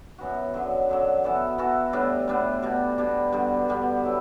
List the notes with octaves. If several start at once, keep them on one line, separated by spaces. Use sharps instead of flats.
F#2 E3 B3 F#4
F#2 D3 F#3
F#2 D3 F#3
E3 B3 F#4 A4
E3 B3 F#4 A4
A2 G3 B3 D4
A2 G3 B3 D4
B2 G3 D4
B2 G3 D4
G2 D3 G3 B3
G2 D3 G3 B3
F#3 A3 E4